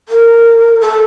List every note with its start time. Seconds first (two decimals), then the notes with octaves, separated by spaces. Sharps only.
0.09 A#4
0.81 A4